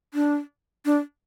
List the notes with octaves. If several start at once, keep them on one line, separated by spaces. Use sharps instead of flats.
D4
D4